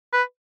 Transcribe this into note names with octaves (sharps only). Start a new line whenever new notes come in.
B4